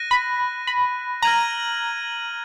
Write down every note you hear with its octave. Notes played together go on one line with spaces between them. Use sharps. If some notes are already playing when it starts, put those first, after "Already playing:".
Already playing: F#6 A#6 D#7
B5
B5
A#5 F6 G#6 D#7 F#7